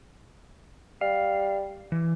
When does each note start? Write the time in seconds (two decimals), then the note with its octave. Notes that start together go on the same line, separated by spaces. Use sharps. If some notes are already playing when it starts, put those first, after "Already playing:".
1.01 G3 F5
1.92 E3